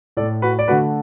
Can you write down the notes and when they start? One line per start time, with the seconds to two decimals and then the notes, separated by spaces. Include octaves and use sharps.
0.17 A2 A4 D5
0.21 A3
0.42 F#4 B4
0.59 D5
0.68 D3 A3 F#4 B4